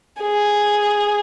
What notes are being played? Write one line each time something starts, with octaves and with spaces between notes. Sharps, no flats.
G#4